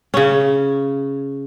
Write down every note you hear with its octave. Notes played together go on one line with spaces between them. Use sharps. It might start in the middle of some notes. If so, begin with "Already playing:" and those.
C#3 C#4